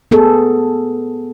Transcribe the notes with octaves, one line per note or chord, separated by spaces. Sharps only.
B3 G#4 A4